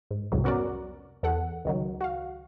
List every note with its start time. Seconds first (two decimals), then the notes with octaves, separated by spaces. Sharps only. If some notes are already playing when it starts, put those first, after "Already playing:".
0.11 G#2
0.32 C2 F2 G#2 C3 F#3
0.44 B3 C#4 F#4 A#4 D5
1.23 E2 A4 F#5
1.65 C#2 D#3 F#3
2.01 F#4 F5